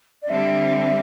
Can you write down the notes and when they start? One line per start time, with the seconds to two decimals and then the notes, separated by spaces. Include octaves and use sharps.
0.22 D5
0.29 D3 G3 C4 E5